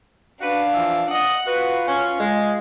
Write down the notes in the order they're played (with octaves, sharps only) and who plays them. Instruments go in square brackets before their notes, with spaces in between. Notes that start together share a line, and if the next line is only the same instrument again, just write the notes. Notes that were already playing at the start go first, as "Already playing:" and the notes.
[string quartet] D4 F5 [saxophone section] F#4 B4
[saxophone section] E3 F3
[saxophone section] D#5 [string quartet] F#5
[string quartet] F4 [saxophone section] F#4 B4
[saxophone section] C#4
G#3